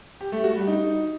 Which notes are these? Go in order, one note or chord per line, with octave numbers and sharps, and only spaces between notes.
G4
A3
F#4
G3
D#4